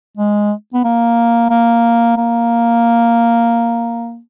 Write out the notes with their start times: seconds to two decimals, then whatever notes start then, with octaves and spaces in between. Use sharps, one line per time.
0.17 G#3
0.74 B3
0.84 A#3
1.50 A#3
2.17 A#3